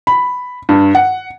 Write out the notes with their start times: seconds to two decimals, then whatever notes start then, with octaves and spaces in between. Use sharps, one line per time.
0.07 B5
0.69 G2
0.95 F#5